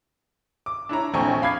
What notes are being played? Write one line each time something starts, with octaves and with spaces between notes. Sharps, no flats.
D6
D4 E4 C#5 A#5
F1 A#1 C4 G#5 C#6
F5 B5 D6 G#6 C7